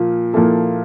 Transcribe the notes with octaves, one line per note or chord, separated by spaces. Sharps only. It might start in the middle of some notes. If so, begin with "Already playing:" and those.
Already playing: A#2 F3 A#3
A#2 F3 A#3 E4 A4